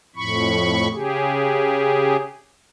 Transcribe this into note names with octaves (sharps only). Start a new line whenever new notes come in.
F2 A2 B5 C#6
C#3 G4 G#4